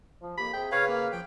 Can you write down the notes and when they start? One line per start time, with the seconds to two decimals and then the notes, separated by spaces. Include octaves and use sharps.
0.21 F3
0.38 F2 A#3 G4 B5
0.53 C3 G#4 G5
0.72 C#3 B4 C#5 F5 F6
0.88 A#3
1.12 F3 G5